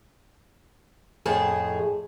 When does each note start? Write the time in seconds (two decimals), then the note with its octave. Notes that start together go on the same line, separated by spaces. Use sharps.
1.26 F2 A2 G#4 A5